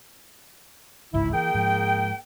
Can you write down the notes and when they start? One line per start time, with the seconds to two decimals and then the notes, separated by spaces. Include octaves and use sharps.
1.14 G1 C#2 G#2 E4
1.33 E3 A#3 G#4 G5
1.54 G#2 F3